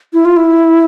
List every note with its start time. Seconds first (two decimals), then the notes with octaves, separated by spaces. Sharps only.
0.13 E4
0.25 F4
0.37 E4